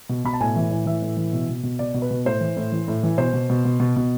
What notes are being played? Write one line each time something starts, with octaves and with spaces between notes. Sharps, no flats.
B2
B2 B5
A5
A2 G#5
E3
A2
E3 E5
A2
E3
B2
B2
B2
B2 D5
B2
B4
B2
A2 C5
E3
A2
E3
A2
E3
B2 C5
B2
B2
B2
B2
B2